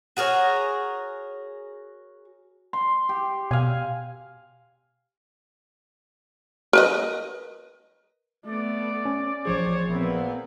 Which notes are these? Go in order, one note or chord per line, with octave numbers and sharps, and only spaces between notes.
F#4 G#4 A#4 C#5
C6
G4
B2 F5 G#5
A#4 B4 D#5
A3 B3 D5
C#4
A1 F3 G#4 C5 C#5
A#2 B3 C4 E4